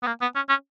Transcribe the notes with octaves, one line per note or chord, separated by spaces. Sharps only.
B3
A#3
B3
C#4
C#4